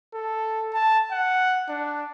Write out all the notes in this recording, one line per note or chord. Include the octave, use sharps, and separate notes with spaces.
A4
A5
F#5
D4